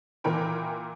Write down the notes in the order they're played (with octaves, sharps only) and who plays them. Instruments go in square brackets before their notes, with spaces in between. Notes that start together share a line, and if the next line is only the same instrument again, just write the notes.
[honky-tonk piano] A#2 E3 A#4 G5 B5